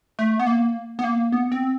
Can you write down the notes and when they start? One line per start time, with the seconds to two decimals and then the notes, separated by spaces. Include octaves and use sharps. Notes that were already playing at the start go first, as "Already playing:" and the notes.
0.19 A3
0.40 B3
0.47 A#3
0.99 B3
1.04 A#3
1.32 B3
1.52 C4